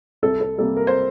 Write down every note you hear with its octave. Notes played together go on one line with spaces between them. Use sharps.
C2 A4
A4
C3 G3 A#3 A4
A#4
C5